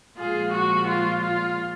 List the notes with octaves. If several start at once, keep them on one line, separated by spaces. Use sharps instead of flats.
A#2 F3 G#3 F4 G#4
F#4
F4
F4